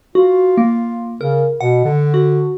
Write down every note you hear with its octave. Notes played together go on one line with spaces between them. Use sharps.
F4 F#4
A#3
C#3 A#4
B2 F#5
D3
F#4